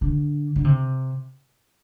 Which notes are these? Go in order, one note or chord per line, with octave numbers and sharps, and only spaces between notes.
D3
D3
C3